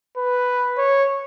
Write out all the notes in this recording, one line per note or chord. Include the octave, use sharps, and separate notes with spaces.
B4
C#5